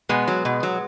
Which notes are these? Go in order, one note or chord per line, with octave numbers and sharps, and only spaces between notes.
B2 G#3 B3
F#3
B2
F#3